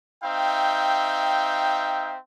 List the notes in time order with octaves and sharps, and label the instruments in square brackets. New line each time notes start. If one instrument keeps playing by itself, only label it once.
[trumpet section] C4 D#4 E5 F5 G5